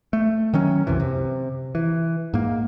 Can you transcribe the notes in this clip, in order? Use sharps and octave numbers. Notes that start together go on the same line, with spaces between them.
A3
D#3 F#3 C#4
C2 F#2 C3 E3
C3
E3
G#2 A#3